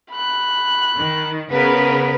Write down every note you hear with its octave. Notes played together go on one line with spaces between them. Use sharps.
B5 F#6
D#3
C#3 B3 A#4 B4